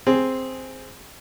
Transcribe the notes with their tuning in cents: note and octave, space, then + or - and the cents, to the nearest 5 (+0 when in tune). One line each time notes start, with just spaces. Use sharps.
C4 +0 G#4 +0